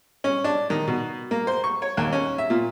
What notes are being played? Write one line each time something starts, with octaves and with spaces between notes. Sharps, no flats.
C#4
D4
D#3
B2
A#3
C5
C#6
C#5
D#2
C#4
E5
A#2